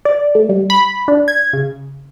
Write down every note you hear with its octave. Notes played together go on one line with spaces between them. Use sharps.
D5
A3
G3
B5
D4
G#6
C#3